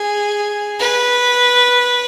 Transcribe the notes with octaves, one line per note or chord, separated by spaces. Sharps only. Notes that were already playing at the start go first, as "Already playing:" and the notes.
Already playing: G#4
B4